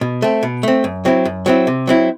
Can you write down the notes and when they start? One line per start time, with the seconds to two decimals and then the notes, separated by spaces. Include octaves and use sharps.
0.01 B2
0.22 A3 C4
0.43 B2
0.63 A3 C4
0.84 F#2
1.05 F#3 C4 E4
1.25 F#2
1.46 F#3 C4 E4
1.67 C3
1.87 F#3 C4 E4